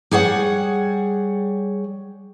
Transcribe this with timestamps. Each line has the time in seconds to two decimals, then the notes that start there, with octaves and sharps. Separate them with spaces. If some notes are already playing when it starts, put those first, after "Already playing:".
0.11 G3 G#4 C#5 F#5